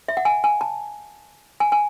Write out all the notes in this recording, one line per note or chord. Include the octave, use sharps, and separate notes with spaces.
E5
F#5
G#5
G#5
A5
G#5
G#5